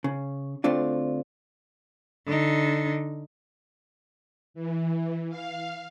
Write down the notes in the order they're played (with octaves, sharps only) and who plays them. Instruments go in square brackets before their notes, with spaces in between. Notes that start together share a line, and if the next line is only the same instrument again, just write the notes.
[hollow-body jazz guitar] C#3
D2 A3 C4 D4 F4
[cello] D3 D#4
[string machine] E3
F5